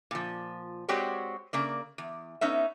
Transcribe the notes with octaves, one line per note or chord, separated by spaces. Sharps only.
A#2 F3
G#3 C4 F#4 G4 C#5 D5
C#3 A#3 D5
E2
B3 C#4 D#4 E5